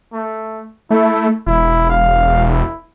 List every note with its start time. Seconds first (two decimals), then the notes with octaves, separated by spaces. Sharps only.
0.13 A3
0.91 A3 E4
1.47 E1 E4
1.90 F5
2.49 E4